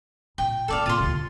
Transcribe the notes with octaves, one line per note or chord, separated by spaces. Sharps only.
A#2 G5
A3 E4 A4 D5 F5
A#2 F4 C6
D2 C3